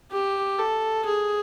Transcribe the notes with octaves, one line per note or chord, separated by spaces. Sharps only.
G4
A4
G#4